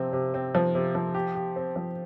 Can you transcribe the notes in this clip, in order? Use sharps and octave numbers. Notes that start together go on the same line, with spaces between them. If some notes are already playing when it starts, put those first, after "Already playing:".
Already playing: C3 F3 C4
C3
C4
F3
C3
F3
G4
G4
C4
F3